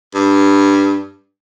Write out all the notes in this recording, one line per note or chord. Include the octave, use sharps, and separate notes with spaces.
G2